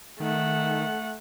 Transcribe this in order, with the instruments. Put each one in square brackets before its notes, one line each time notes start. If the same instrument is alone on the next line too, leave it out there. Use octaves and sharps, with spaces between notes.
[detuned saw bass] D#3 [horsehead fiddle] A3 F#5